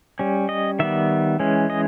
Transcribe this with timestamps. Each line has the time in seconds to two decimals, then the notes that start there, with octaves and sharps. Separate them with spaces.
0.19 G3 C#4
0.49 D#5
0.79 D#3 G3 B3 E5
1.40 E3 G#3 C#4
1.70 D#5